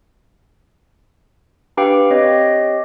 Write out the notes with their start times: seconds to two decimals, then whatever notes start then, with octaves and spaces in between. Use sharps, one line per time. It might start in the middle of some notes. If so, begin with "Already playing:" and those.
1.77 D4 G4 B4 F5 G5
2.11 C4 G4 C#5 D#5